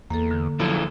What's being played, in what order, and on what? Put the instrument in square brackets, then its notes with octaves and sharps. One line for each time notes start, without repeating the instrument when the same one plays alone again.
[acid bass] E2 [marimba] A#3 A4
[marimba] D3
[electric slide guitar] F3 E4 A4 [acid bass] F#3